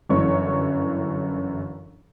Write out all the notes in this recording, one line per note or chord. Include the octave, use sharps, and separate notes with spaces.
G1 F#2 E3 C#5 C#6